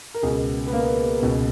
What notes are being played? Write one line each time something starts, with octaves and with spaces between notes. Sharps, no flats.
A#4
C#2 B2 G#4
B3
A#3
C#2 B2